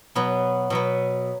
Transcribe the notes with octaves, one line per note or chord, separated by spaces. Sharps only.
B2 F#3 B3
B2 F#3 B3